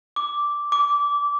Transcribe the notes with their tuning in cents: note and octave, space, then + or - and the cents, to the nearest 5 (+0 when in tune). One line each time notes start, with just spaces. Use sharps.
D6 -5
D6 -20